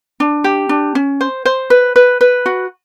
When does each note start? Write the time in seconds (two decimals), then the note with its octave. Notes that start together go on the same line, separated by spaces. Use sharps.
0.20 D4
0.44 G4
0.69 D4
0.95 C#4
1.21 C5
1.45 C5
1.70 B4
1.96 B4
2.21 B4
2.46 F#4